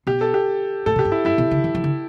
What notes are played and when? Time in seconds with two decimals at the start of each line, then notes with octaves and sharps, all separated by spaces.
0.07 B2 G4
0.21 A4
0.34 G4
0.86 A2 A4
0.96 B2
0.99 G4
1.05 G2
1.12 E4
1.25 G2 E4
1.38 B2
1.51 D3
1.64 E3
1.75 E3
1.84 D3